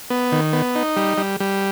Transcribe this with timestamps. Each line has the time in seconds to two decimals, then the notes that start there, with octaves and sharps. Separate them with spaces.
0.10 B3
0.32 D#3
0.53 B3
0.75 D#4
0.96 G3
1.18 G3
1.40 G3